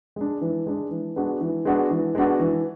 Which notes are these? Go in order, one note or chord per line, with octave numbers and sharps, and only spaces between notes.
G#3 D4
E3
G#3 D4
E3
G#3 B3 D4 F#4
E3
G#3 B3 D4 F#4
E3
G#3 B3 D4 F#4
E3